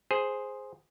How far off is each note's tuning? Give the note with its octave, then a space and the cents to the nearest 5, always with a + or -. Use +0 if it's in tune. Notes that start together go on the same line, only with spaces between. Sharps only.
G#4 +0 C5 +0